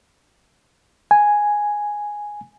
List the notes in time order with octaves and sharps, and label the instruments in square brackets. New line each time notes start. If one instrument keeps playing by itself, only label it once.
[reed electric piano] G#5